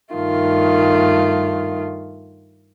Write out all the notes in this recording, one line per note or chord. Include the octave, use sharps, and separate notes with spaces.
G2 D#3 A3 F4